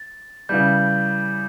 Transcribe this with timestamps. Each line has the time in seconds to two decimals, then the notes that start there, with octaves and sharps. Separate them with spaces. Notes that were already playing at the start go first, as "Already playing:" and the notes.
Already playing: A6
0.49 C#3 E3 G3 G6